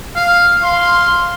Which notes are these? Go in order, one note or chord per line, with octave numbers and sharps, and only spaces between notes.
F5
F5 C6